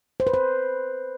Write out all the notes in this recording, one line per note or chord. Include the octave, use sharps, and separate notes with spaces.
C5
B4
C5